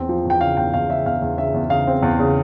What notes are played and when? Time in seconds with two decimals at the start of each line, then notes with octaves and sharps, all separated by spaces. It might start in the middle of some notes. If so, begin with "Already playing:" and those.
Already playing: E2 C4
0.09 F3
0.25 E2
0.30 G5
0.41 C#3 F5
0.57 E2 G5
0.74 E2 F5
0.90 C#3 E5
1.06 E2 F5
1.22 E2
1.38 C#3 E5
1.54 E2
1.70 C#3 F5
1.87 C4
2.02 E2
2.19 C#3